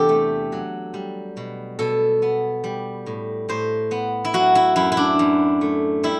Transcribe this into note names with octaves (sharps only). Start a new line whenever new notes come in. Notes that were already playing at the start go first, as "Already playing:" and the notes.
Already playing: E2 C3 D4 G4 A4
A3
F#3
G3
B2
B2 A4
B3
G3
A2
A2 C5
B3
E4
F#3 F#4
E4
F#2 E4
E4
D4
F#2
A3
G3 E4